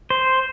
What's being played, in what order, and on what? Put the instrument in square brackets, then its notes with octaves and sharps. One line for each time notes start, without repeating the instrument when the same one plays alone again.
[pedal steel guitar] C5